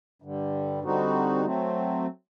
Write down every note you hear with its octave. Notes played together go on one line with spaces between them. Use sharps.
G2 D3 G3
D3 G3 C4 D#4 F#4
F#3 A3 C4